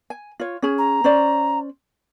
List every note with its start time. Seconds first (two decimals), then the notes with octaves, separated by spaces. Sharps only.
0.10 G#5
0.40 F4 C#5
0.62 C#4 G#4
0.78 A#5
1.04 C#4 C5 D5